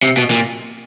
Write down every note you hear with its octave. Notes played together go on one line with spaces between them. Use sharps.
C3
B2
A#2